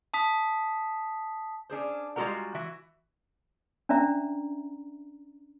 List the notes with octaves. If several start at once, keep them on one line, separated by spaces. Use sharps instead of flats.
A5 D#6 B6
C#4 D4 G#4 C5
G3 G#3 F4 F#4 A#4 A#5
E3 F#4 E5
C#4 D4 D5 E5 A#5